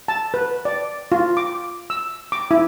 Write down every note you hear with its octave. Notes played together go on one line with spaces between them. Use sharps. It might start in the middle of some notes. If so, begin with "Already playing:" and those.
A5
B4
D5
F4
D6
E6
D6
E4